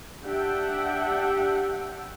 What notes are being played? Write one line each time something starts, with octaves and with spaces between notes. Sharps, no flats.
D4 G4 E5 F#5 G5